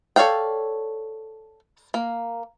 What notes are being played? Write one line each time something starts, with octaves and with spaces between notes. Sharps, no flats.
A4 C#5 D5 F5 G5
A#3